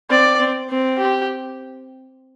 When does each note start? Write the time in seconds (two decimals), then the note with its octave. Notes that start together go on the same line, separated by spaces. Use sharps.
0.10 C4 D5
0.40 C4
0.69 C4
0.98 G4